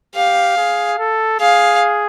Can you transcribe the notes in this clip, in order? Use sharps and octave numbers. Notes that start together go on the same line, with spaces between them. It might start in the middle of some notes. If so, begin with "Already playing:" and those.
G4 F5
G#4
A4
G#4 F5